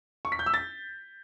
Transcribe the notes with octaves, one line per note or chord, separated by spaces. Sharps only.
C#6
B6
G6
E6
A6